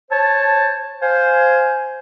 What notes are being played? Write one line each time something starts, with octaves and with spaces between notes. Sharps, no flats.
C5 C#5 A5
C5 F5 G#5